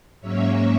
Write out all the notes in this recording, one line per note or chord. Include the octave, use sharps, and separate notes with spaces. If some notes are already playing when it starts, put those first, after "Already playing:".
G#2 F#3 A#3 C#4 C#5 E5